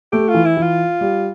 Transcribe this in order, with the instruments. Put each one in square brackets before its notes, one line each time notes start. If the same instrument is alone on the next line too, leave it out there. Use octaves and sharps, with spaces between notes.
[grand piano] A3 [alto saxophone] G4
[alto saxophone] F4
[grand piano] E3
[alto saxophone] E4
[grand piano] E3
[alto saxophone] F4
[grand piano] G3